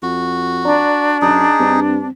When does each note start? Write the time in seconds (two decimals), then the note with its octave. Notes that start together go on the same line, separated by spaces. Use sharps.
0.03 F2 F#4
0.65 D4 D5 A#5
1.22 F#2 D#4 G#4
1.60 G2 C4